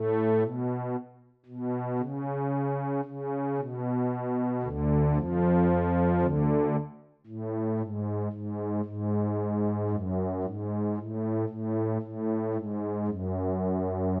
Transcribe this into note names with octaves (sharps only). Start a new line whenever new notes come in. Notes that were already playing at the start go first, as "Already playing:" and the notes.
Already playing: A2 A3
B2
B2
C#3
C#3
B2
D2 D3
F2 F3
D2 D3
A2
G#2
G#2
G#2
F#2
G#2
A2
A2
A2
G#2
F#2